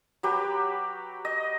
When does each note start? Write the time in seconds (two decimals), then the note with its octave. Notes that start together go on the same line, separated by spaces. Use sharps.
0.23 F#3 G4 B4
1.25 D#5